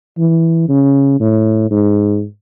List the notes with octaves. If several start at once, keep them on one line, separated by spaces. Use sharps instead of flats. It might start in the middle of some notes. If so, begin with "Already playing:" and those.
E3
C#3
A2
G#2